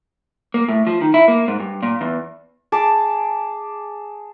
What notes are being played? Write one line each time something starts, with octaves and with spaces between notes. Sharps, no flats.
A#3
A2
F3
D#3
E4
A#3
G#2
G2
A#2
E2
G#4 A5 B5 D6